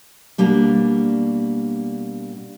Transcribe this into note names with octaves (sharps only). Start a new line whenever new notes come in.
B2 G3 A#3 D4